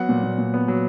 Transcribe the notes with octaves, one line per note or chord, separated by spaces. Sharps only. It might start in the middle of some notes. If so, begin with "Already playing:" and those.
Already playing: F#3 B3 F#5
A#2
A#2
A#2
B3
F#3